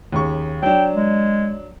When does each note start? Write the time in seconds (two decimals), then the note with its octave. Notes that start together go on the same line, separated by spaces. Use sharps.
0.12 D#2 C#3 C#6
0.62 F#3 D4 G5
0.95 G#3